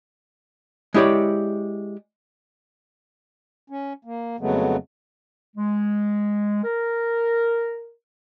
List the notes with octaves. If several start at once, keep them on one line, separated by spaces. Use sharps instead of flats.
G#3 E4 G4 C#5 D5
C#4
A#3
F2 C#3 F#3 G#3 A3 B3
G#3
A#4